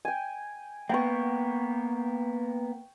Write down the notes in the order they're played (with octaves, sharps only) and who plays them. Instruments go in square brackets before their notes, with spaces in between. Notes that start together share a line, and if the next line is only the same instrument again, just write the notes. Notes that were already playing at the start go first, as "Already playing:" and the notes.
[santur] G5 G#5
[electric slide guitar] A#3 B3 [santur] G5 C#6